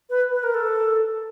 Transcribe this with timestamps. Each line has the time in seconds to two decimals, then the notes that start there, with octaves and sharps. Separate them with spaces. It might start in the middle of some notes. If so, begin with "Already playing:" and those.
0.10 B4
0.32 B4
0.43 A#4
0.54 A4